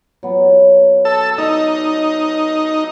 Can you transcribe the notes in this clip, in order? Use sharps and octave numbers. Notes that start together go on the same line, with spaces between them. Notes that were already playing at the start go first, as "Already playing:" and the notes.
F#3 B3
A4 E6
D#4 D5 D#5